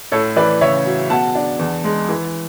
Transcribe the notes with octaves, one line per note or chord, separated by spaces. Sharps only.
A2 A4 C#5
E3 B4 D5
C#3 C#5 E5
F#3
B2 F#5 A5
D4
E2
G#3
E3